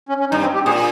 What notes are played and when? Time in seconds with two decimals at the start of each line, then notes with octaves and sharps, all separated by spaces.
0.09 C#4
0.20 C#4
0.31 G2 D#4
0.43 C4
0.54 G4
0.66 A#2 G#4